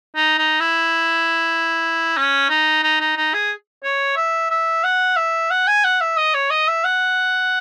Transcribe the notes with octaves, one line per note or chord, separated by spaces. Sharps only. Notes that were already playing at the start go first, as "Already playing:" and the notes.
D#4
D#4
E4
C#4
D#4
D#4
D#4
D#4
G#4
C#5
E5
E5
F#5
E5
F#5
G#5
F#5
E5
D#5
C#5
D#5
E5
F#5